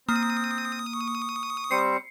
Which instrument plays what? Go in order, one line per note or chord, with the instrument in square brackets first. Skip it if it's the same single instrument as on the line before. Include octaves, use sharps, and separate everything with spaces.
[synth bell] A#3 [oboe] C4 [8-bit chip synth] D#6
[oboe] C#6
[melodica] G3 C4 C5 [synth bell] C7 C#7